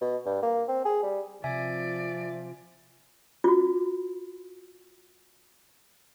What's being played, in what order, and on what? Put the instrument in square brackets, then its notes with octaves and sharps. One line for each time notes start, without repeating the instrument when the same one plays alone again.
[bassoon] B2
G2
A#3
C4
G#4
G3
[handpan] C3 [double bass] F3 [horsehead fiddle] D5 [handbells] E5 G#5
[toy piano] F4 F#4